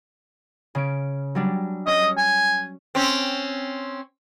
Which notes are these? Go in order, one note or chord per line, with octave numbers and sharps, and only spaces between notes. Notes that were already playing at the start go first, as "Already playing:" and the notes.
C#3 C#4 D7
F#3 G3 D4
C#4 D#5
G#5
C4 C#4